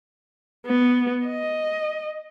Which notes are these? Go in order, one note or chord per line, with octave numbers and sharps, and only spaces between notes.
B3
D#5